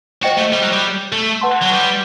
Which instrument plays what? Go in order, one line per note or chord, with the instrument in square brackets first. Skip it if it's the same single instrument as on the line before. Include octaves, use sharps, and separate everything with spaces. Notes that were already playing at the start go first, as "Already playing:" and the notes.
[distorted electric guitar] F#4 [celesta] C5 D#5 G5
[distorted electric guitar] A3
G3
F#3
G3
A3
[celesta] B4 F#5 A5 C6
[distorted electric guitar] F#3
G3